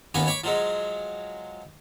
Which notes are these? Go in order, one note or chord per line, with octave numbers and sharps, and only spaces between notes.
D#2 B3 C#4 G#5 B5
C#5 B5 C#6 D6
F3 F#3 G#3